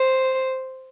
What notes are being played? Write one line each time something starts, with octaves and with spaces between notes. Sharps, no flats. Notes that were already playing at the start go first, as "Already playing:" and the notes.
Already playing: C5